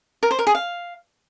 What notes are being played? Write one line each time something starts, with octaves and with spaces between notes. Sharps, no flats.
A#4
C5
A#4
G#4
F5